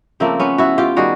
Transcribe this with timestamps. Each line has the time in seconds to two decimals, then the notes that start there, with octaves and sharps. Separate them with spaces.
0.20 C#3 F3 A3 A#3 C4
0.40 B3 C#4
0.58 E4 F#4
0.78 F4 G4
0.96 D#3 G3 F#4 G#4